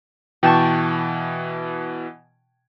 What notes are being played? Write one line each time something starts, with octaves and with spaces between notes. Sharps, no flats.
B2 E3 G5 A5 C#6